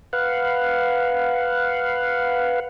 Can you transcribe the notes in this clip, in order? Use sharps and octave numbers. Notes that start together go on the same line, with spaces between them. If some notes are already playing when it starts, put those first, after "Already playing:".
B4 F5 F#5